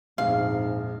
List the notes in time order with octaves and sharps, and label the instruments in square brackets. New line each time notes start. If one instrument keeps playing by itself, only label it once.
[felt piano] A#1 F2 [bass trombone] G#2 [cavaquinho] F5